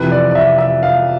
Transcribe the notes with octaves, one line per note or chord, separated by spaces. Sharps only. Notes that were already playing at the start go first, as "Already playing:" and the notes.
Already playing: F2 C3 E3 B4
D5
D5
E5
E5
F5